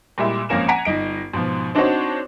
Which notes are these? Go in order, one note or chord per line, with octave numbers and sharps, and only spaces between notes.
A#2 G3 G#3 E4
G#1 F3 A#3 C#4 A#4 E7
F#5 G#5 A#5 A#6 B6 D7
G1 D#4 D7
G#2 B2 F3
C4 D4 D#4 F#4 C5 C#5